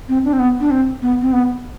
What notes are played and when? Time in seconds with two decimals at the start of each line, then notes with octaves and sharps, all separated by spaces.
0.09 C4
0.25 D4
0.33 C4
0.39 B3
0.60 D4
0.71 C4
1.02 B3
1.22 C4
1.33 B3